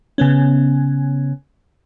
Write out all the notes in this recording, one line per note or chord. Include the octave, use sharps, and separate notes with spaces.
C#3 B3 C#4